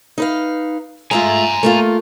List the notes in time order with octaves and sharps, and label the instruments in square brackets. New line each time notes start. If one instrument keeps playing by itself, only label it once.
[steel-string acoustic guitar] D#4 B4 F5
[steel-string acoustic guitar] G#3 A3 F4 [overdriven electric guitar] G#5 A#5
[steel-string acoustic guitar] A3 A#3 F4